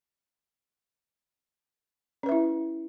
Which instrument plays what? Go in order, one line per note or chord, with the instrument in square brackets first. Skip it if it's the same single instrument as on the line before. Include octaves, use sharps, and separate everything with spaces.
[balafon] C#4
B4
E5
E4